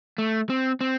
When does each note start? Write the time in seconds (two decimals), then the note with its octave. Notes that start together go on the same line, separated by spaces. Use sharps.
0.18 A3
0.50 C4
0.81 C4